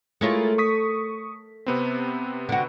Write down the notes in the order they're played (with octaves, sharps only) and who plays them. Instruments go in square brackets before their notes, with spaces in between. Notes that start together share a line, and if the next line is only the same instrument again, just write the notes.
[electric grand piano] G#3 E4 F4 [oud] A3 A#4 C#5
[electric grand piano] C#6 D#6 B6
C3 B3 C4
[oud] D3 F#4